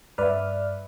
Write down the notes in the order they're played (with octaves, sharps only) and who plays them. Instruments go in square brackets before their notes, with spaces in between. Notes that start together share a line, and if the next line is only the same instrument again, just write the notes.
[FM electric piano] G2 D5 F6 [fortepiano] B4 E5